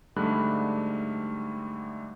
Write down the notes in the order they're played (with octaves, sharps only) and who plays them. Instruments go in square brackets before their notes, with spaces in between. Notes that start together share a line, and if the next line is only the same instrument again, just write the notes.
[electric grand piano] G#2 D3 G3 A3 B5 F#6